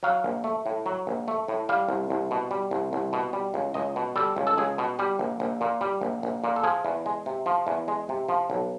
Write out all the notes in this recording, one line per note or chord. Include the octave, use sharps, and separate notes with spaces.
F#3 F5
A#1
A3
A2
F#3
A#1
A3
A2
G3 F5
C2
C2
B2
G3
C2
C2
B2
G3
C#2
C#2 D#5
B2
G3 A4
C#2
A4
C#2 G#4
B2
G3 G4
A#1
A#1
A#2
G3
A#1
A#1
A#2
A4
F3 G#4
E2
G#3
C3
F3
E2
G#3
C3
F3
B1